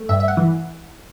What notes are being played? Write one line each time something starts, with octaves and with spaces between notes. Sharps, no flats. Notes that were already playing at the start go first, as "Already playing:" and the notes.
Already playing: A3
G2 E5
E5
F#5
E3